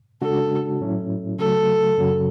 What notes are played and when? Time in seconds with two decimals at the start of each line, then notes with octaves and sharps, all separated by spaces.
0.21 C#3 G#3 D4 F#4 A4
0.81 A2 F#3 C#4 E4
1.38 C#3 F#3 A3 A4
1.97 F#2 C#3 F#3 C#4